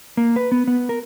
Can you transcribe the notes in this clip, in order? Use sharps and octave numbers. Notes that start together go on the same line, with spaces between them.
A#3
B4
B3
B3
A#4